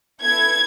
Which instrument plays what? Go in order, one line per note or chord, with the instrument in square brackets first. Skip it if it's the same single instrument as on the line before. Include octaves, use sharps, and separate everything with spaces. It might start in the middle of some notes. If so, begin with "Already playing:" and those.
[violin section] B3 E4 A4 G#6